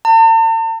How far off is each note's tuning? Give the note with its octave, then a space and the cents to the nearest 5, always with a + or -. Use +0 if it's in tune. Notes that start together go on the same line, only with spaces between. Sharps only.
A5 +45